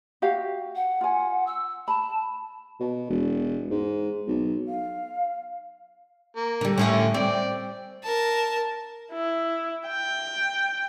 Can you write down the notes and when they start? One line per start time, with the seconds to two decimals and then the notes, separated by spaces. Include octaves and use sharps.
0.22 F#4 G4 F5
0.76 F#5
1.01 F4 G#5
1.47 E6
1.88 A5 B5
2.80 B2
3.10 E1
3.71 G#2
4.28 B1
4.67 F5
6.36 A#3
6.61 D3 G3
6.78 A2 D3 C#4 E4 G5
7.14 C4 D5 G5
8.04 A#4 A5
9.12 E4
9.88 G5